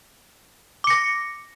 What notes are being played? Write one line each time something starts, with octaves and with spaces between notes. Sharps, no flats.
D6 A#6 C#7